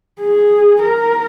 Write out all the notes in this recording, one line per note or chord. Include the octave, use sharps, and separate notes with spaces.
G#4
A#4